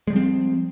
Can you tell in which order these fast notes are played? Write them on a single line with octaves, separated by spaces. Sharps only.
G#3 G3 F3 C4